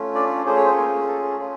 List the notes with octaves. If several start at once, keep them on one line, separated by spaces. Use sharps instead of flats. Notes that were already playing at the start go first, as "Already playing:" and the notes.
Already playing: A3 C#4 F4
D4 D5
A3 C#4 F4 G#4 C5
C#5
C4 C5
A#3 A#4
A4
A3 C#4 F4 G#4